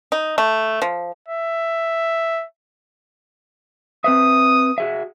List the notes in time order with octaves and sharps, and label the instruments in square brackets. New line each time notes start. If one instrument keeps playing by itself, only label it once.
[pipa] D#4
A3
F3
[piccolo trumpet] E5
[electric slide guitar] C4 B4 E5 [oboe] D#6
[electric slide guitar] F#4 G#4 E5